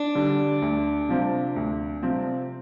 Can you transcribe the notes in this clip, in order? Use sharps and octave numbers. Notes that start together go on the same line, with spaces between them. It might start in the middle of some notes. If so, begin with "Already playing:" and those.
Already playing: D4
D3 G3
D2
C3 F3 C4
D2
C3 F3 C4